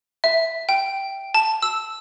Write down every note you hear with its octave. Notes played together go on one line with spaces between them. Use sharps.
E5
G5
A5
E6